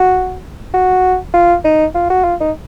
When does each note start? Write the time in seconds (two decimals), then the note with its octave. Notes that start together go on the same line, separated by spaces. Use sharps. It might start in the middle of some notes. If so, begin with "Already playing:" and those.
Already playing: F#4
0.74 F#4
1.34 F4
1.64 D#4
1.95 F4
2.10 F#4
2.24 F4
2.40 D#4